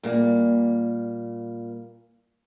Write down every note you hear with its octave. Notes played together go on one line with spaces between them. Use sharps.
A#2 G3 A#3